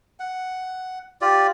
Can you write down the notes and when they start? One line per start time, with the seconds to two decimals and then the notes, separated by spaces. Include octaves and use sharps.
0.20 F#5
1.21 F4 G4 D5